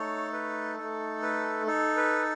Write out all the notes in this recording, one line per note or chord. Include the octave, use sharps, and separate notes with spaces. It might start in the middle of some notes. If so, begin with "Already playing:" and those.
Already playing: A3 D#4 A4 C#5
B4
A3 D#4 A4
B4
D#4 A4
B4